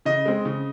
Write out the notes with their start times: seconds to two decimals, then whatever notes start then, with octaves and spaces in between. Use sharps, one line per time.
0.05 C#3 D#5
0.25 G#3 C4
0.45 C#3